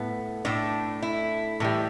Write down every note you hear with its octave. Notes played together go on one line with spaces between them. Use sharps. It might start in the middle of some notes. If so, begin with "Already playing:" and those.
Already playing: A2 A3 B3
A2 A3 D4
E4
A2 E3 G3